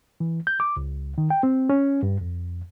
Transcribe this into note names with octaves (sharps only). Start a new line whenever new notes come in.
E3
G6
D6
C#2
D#3
G5
C4
C#4
G2
F2